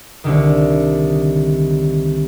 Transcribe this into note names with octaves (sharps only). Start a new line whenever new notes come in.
C2 D3 D#3